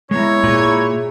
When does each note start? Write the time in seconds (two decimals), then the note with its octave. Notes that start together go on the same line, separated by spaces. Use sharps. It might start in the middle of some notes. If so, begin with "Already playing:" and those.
0.11 G#3 B3 E4 C#5 A#5
0.44 A#2 G#4 A#5